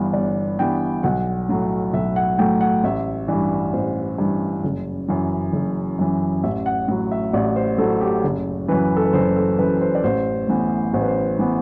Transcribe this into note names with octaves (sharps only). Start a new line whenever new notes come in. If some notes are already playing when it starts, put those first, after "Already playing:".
Already playing: G1 G2 E3 B3
G1 D5
G2 E3 B3 G5
B1 F#5
A2 F#3 A3
B1 E5
F#5
A2 F#3 A3 G5
F#5
A1 E5
G2 E3 D5
A1 C5
G2 E3
F#1
F#2 E3
F#1
F#2 E3
A1 E5
F#5
A2 F#3 F#5
E5
A1 D5
C5
A2 F#3 A4
G4
F#1
F#2 E3 B4
A4
B4
F#1 C5
A4
F#2 E3 B4
B4
C5
D5
A1 C5
A2 E3 B3
A1 C5
B4
C5
A2 E3 B3 E4